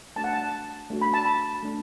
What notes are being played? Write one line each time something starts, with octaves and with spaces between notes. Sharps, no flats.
A3 D4 F#4 A5
F#5
A5
A3 D4 F#4
B5
A5
B5
A3 D4